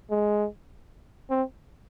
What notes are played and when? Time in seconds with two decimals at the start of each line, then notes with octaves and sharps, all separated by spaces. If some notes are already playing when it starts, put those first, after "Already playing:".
0.11 G#3
1.30 C4